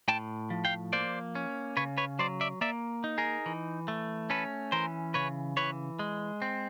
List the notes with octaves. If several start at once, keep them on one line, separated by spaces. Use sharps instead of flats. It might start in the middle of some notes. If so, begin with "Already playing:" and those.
A2 G5 A5
F3
F5 G5
A#3 C5 D5
C#4
C#3 B4 C#5
B4 C#5
F#3 C5 D5
D5 E5
A#3 D5 E5
D#4
G#4 A#4
E3
A3
C#4 A4 B4
E3 A#4 C5
C#3 B4 C#5
E3 B4 C#5
G#3
C4